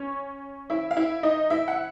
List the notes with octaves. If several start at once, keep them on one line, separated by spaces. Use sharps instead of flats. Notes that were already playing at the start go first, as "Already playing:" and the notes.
Already playing: C#4 C#5
E4 E5
F5
E4 E5
D#4 D#5
E4 E5
F#5